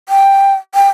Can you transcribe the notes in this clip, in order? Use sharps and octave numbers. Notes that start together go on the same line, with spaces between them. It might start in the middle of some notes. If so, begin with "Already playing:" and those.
G5
G5